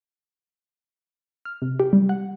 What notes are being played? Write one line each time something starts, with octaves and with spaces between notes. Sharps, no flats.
F6
C3
G4
G3
F#5